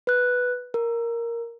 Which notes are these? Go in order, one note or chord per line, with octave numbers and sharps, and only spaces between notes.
B4 F#6
A#4